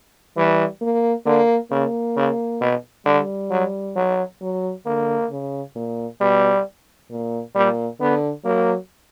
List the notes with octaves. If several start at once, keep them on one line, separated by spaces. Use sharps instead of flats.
E3 G3
A#3
D3 A#3
C#3 A#3
C#3
B2
D3 G3
F#3
F#3
F#3
D3 A#3
C#3
A#2
B2 G3
A#2
A#2 G3
D3 B3
F#3 A#3